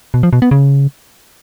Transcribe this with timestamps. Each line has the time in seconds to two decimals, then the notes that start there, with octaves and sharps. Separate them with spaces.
0.14 B2
0.23 F3
0.33 B2
0.42 B3
0.51 C#3